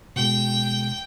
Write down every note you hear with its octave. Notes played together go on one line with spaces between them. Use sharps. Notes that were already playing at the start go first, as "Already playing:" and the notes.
B2 G#3 G5